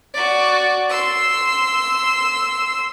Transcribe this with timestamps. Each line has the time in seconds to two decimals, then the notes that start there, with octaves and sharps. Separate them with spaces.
0.14 F#4 D5
0.90 C6 E6